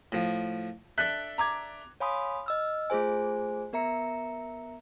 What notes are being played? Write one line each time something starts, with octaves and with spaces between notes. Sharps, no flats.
A2 F3
D4 A4 E5 F#6
A#5 D6 G#6
C#5 F5 G#5 B5 C6 D#6
D#5 E6 F6
A3 F4 G#4 C5 G#5
B3 A#4 E5 A#5 C#7